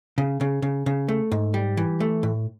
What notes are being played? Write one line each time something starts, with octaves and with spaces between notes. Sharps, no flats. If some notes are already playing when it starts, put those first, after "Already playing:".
C#3
C#3
C#3
C#3
A3
G#2
G3
E3
A3
A2